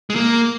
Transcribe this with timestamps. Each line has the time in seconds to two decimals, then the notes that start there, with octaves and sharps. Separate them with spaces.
0.10 G#3
0.16 A#3